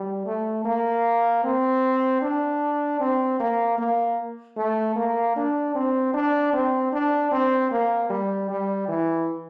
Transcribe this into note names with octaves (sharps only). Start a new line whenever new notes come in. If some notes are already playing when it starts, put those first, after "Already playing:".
Already playing: G3
A3
A#3
C4
D4
C4
A#3
A#3
A3
A#3
D4
C4
D4
C4
D4
C4
A#3
G3
G3
E3